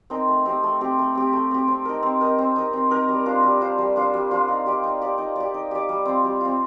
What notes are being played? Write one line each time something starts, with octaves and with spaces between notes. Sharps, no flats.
C4 D#4 A#4
A3
C4 G4
A3
C4 G4
A3
C4 G4
A3
C4 G4
C4
D#4 A#4
C4
D#4 A#4
C4
D#4 A#4
C4
D#4 A#4
G3
D4 F4 C5
G3
D4 F4 C5
G3
D4 F4 C5
G3
D4 F4 C5
D#4
G4 D5
D#4
G4 D5
D#4
G4 D5
D#4
G4 D5
G3
C4 F4
G3
C4 F4